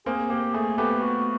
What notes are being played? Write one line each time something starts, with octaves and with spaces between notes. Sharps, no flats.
A#3 C4 G#4
A#3 G4
A3 G#4
A3 B3 G4
F#4